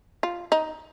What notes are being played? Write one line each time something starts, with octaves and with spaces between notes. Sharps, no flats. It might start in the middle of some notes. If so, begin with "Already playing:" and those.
F4
D#4